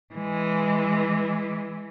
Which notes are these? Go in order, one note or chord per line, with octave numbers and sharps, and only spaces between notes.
E3 G#3